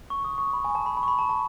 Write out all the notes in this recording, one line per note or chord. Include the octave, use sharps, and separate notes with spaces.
C#6
D#6
C#6
B5
G#5
A5
B5
B5
C#6
B5
A5
A5